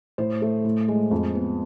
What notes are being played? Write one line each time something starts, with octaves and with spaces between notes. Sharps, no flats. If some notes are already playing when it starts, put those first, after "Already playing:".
A2 C5
A3
A2
G#3
F2
B3